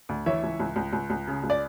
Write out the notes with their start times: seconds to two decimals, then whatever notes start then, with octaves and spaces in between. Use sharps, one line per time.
0.09 D2
0.26 E3 C#5 E5
0.43 C#2
0.60 C#2
0.76 C#2
0.93 C#2
1.10 C#2
1.27 C#3
1.43 C#2
1.50 D5